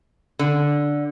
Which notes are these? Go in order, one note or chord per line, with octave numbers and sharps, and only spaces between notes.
D3